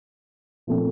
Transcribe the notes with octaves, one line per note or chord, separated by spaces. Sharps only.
A#2 F3 A3 C4 F4